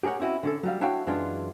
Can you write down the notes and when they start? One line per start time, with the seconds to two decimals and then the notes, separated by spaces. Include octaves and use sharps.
0.03 G4 G#4 A#4 C#5 F#5
0.19 C4 C#4 E4 F#4 D#5
0.43 D3 C#4 A4
0.63 F#3 G3 F5
0.81 D4 E4 F#4 C#5 F5 G5
1.07 F#2 E3 G#3 D4 F4